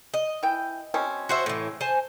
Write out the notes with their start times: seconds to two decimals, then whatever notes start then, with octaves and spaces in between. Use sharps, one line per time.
0.14 D#5
0.43 E3 G5
0.94 B2 C4 C#4
1.29 F#4 C5 E5
1.46 A2 E3
1.81 C5 G#5 A5